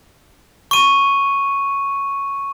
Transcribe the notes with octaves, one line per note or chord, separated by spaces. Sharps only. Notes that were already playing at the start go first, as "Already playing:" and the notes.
C#6 D#7